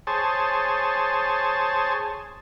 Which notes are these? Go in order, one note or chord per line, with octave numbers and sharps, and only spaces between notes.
G#4 C5 C#5 A5